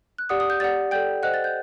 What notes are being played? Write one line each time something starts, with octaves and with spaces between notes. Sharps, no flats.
F#6
G4 D5 F#5 D#6
D#6
G6
G4 D5 F#5 A6
A4 D5 G5 G6
C5 D#5 F#5 F#6
A6
G6